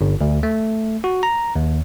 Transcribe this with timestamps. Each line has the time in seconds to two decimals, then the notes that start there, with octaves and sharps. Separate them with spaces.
0.01 G1
0.21 D2
0.43 A3
1.04 F#4
1.23 A#5
1.56 D#2